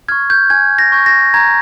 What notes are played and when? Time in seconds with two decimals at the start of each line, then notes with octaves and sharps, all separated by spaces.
0.09 C#6 F6 G#6
0.30 G6
0.50 G#5 G#6
0.79 A#6
0.92 C#6 G6
1.06 A#6
1.34 A#5 G#6